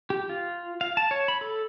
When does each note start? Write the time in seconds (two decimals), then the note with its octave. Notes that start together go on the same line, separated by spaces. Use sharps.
0.10 G4
0.29 F4
0.81 F5
0.97 A5
1.11 C#5
1.28 B5
1.41 A4